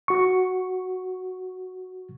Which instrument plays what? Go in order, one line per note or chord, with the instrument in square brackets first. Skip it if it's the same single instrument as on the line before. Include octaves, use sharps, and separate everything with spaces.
[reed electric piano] F#4 C#6